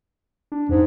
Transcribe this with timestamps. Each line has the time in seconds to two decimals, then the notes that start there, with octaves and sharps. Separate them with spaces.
0.52 D4
0.69 F2 G#2